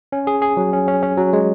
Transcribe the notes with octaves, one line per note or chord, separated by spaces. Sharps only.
C#4
G#4
G#4
F#3
C#4
C#4
C#4
F#3
G#3